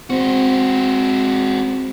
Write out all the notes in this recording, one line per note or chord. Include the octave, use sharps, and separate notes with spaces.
G#3 C4 F#4